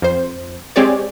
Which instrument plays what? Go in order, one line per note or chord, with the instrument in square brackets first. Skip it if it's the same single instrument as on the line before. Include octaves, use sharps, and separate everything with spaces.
[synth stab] F2 C5
G#3 C4 G4 G#4 C#5 D5